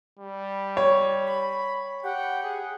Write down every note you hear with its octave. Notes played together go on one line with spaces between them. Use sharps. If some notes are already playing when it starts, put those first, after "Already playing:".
G3
C#5
B5
G4 F#5 G5
G#4